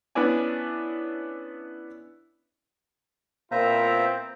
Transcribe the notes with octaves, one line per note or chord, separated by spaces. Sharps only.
B3 C#4 D4 E4 D5 G#5
A#2 B3 C4 E4 F4 C5 E5 A#5